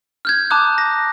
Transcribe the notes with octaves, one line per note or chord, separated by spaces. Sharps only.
F6 G6 G#6
A5 A#5 D6 D#6 F#6
A#6